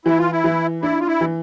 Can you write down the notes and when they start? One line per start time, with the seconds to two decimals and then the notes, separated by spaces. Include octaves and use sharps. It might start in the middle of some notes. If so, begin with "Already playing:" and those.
0.05 E3 E4
0.18 F4
0.32 E4
0.44 E3
0.82 D4 E4
1.00 F4
1.07 E4
1.21 E3